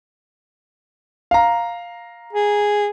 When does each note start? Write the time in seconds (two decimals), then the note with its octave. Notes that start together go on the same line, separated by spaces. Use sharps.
1.31 F5 A#5
2.33 G#4